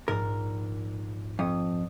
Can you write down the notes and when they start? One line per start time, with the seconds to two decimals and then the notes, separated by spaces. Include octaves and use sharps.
0.08 A#1 G#2 A#4 A6
1.39 F2 D#6